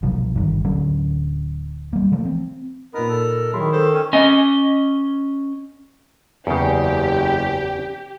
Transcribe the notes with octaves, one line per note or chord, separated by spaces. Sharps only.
C2 B2 F3 F#3
G1 D#3
D1 D3 F#3 C#4
G3 A#3
E3 F3 A3 A#3
C4
A#2 B3 D#4 A#4
A4
D#3 F#3 E4 G#4 C6
A4 C5
C#4 G5
C#4 D#5 G#5
F#1 E2 C#3 G4